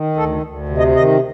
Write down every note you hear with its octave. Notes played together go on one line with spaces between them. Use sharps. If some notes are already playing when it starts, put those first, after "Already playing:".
Already playing: D#3
D2 A4
D2
C3
D#5
D#3 D#5